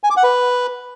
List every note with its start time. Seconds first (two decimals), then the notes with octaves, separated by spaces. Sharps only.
0.04 G#5
0.10 D6
0.17 F#5
0.23 B4